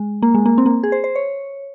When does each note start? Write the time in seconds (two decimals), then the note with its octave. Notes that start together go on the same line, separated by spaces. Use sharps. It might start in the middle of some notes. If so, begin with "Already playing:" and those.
Already playing: G#3
0.22 A#3
0.34 G#3
0.46 A#3
0.58 C4
0.66 A#3
0.83 G#4
0.92 C5
1.04 C5
1.15 C#5